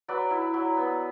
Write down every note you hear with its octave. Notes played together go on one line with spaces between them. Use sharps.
F#3 B4 D5
E4
F#3
B3